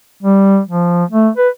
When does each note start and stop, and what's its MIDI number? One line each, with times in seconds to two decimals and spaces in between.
0.22 0.60 55
0.68 1.04 53
1.10 1.29 57
1.37 1.49 71